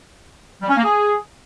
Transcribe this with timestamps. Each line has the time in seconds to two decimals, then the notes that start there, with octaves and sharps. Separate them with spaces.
0.62 G3
0.69 C#4
0.76 A#3
0.84 G#4